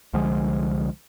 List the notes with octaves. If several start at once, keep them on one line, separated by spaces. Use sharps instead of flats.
C2 D3 F3 G#3